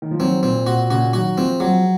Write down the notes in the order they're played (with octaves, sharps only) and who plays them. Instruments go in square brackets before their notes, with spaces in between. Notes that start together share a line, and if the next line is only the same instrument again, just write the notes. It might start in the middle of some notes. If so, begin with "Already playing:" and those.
[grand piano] D#3
F3
[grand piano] D#3 F#3 [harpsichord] C4
[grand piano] A#2 [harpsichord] C4
[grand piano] A#2 [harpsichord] F#4
[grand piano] A#2 C#3 [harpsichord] F#4
[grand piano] D#3 F#3 [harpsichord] F#4
[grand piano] F3 G#3 [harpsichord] C4
[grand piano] F3 G#3 [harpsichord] F#3